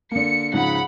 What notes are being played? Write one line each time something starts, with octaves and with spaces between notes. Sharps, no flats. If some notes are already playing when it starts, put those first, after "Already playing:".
D3 A#3 C#7
G#2 C#3 F3 F#5 B5